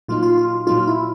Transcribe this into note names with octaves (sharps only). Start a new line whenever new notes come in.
A#2 F#3 A#3 D#4 F4
F4
F4
A#2 F#3 A#3 D#4 F4
E4